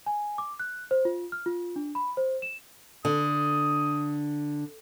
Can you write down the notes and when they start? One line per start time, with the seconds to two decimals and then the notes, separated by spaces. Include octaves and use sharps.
0.06 G#5
0.38 D6
0.60 F#6
0.91 C5
1.05 F4
1.32 F6
1.46 F4
1.76 D4
1.95 B5
2.17 C5
2.42 E7
3.05 D3 D#6